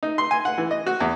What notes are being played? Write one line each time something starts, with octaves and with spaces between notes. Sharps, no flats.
D#4
C6
G#5
F#5
E3
D#5
F#4
E2